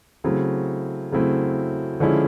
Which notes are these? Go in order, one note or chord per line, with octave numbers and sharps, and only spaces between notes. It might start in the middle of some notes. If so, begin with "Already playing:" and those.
C#3 F#3 A3 C4 E4
C#3 F#3 A3 C4 E4
D3 F3 G#3 C#4 E4